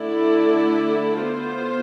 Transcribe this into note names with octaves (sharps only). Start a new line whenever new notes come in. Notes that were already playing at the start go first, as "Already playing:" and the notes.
Already playing: D3 A3 E4 A4 D5
B3 F4 C5